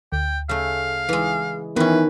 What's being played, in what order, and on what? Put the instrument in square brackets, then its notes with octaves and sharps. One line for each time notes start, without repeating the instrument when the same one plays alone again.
[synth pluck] D2 [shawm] G5
[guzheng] C#3 A3 [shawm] F5
[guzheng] E3 G#3
[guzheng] D#3 C#4 [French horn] E3 [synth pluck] B3 [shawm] B4